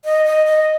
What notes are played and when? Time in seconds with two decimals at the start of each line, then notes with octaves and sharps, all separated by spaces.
0.05 D#5
0.25 D#5
0.46 D#5